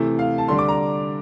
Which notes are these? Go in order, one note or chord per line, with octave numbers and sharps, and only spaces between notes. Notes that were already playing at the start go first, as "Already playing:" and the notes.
Already playing: C3 E3 A3 E4
F5
A5
D3 G3 D4 C6
D6
A#5